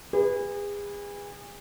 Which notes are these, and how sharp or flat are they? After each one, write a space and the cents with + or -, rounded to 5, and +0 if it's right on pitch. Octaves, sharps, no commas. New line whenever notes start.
G#4 -35 B4 +0